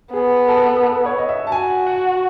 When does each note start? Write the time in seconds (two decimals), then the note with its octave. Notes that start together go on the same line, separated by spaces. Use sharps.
0.13 B3 G#4
0.48 A4
0.75 A4
0.83 B4
1.06 C#5
1.18 D#5
1.29 E5
1.47 A5
1.52 F#4 G#5
1.87 F#5